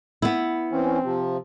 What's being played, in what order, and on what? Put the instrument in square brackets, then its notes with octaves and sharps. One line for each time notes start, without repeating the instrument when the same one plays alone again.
[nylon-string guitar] B3 E4
[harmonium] E3 C#4 [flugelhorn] C4
[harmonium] C3 F3